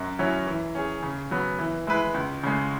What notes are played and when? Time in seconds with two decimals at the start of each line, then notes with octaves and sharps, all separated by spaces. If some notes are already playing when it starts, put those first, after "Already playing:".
Already playing: F#2
0.19 F#3 C#4 E4 C#5
0.47 E3
0.75 C#4 G#4
1.02 C#3
1.31 F#3 B3
1.59 E3
1.87 G#3 E4 B4
2.14 C#2
2.43 C#3 G#3